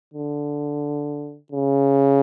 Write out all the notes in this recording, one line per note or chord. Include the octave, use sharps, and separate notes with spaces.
D3
C#3